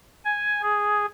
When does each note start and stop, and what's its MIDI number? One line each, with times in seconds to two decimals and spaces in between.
0.25 0.62 80
0.62 1.06 68